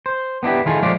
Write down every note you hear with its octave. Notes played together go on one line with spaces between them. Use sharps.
C5
B3 D4 E4 G4
D#3 E4 F4 G#4 A4
F3 G#3 A3 F4 D5